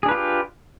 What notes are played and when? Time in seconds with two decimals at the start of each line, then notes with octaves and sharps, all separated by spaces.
0.03 G#4
0.06 D4
0.09 B4
0.11 F4
0.14 G4